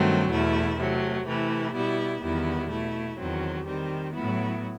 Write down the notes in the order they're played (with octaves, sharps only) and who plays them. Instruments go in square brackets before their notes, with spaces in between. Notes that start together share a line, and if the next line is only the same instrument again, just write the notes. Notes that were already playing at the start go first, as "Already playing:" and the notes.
Already playing: [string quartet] G2 D#3 F#3 A3 C4
E2 B2 A3 E4
C3 F#3 A3
C3 E3 A3 E4
B2 G3 B3 E4
E2 D#3 G3 B3 E4
B2 A3 E4
E2 D#3 F#3 C4
D#3 G3 C4
A2 F#3 B3 E4